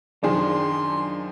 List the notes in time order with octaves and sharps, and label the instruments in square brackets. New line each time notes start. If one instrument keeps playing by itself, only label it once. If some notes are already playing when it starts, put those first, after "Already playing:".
[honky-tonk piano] F#2 D#3 F3 [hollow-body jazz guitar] D4 G#4 [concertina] C6